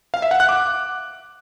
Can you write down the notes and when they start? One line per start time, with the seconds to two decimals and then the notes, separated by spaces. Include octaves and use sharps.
0.14 F5
0.22 E5
0.31 F#5
0.40 F#6
0.49 D6